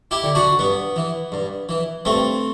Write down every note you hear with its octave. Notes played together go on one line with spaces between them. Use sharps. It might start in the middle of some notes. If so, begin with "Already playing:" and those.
E4 G4
D3
D4 F#4
G2 B3
E3
G2
E3
G2 A3 C4